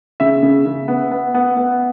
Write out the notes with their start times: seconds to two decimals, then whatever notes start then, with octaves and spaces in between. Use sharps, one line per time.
0.20 C#3 E5
0.43 C#3
0.66 C#3
0.88 B3
1.11 B3
1.34 B3
1.57 B3